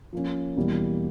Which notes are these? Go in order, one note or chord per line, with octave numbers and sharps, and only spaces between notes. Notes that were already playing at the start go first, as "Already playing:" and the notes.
F3 A#3 C#4
E2 B2 G3 A#3